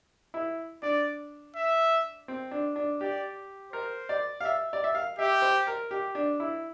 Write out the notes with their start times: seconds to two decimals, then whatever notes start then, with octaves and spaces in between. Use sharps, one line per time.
0.34 E4
0.82 D4 D5
1.56 E5
2.28 C4
2.51 D4
2.76 D4
3.01 G4 D5
3.72 A#4 C5
4.09 D5
4.40 F5
4.45 E5
4.73 D5
4.84 E5
4.95 F5
5.19 G4 E5
5.42 C5
5.67 A#4
5.91 G4
6.15 D4
6.40 E4